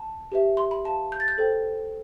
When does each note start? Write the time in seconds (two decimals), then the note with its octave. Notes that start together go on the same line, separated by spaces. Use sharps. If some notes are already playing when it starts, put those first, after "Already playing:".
Already playing: A5
0.32 G4 B4 E5
0.57 C6
0.71 B5
0.85 B4 F5 A5
1.12 G6
1.20 A6
1.28 G6
1.38 A4 C5 G5